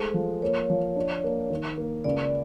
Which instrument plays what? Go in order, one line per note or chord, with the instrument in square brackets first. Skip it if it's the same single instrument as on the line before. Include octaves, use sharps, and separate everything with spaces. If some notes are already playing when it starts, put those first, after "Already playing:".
Already playing: [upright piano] G#3 A3 [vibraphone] C5
[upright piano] F3
[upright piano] A#3 [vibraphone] C#5
[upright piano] F3
D4
A#3
D#3
A#3
[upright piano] C#2 [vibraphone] D5